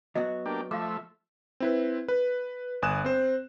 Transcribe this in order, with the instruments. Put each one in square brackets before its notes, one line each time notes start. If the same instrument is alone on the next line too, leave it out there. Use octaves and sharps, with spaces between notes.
[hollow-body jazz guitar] F#3 B3 F#4 [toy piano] D#5
[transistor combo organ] A#3 D4 G4
[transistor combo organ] F3 A3 E5 [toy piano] F5 D6
[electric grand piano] C4 E4 B4
B4
G1 G#5 D#6 F#6 E7
C4 C5